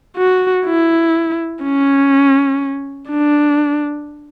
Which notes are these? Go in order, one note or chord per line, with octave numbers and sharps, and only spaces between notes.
F#4
E4
C#4
D4